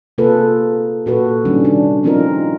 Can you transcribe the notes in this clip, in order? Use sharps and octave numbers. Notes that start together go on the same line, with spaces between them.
C3 A#3 F4 G#4 A4 B4
A#2 F#4 A4 B4
D#3 G3 C#4 D4
C3 D4
F3 C4 C#4 D#4 F4 A#4